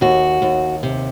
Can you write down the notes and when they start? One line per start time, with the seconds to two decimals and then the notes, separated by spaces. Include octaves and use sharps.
0.01 D#2 F#4
0.42 D#2
0.83 C3